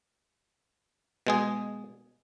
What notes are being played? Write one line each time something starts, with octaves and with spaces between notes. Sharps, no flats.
B2 G#3 G#4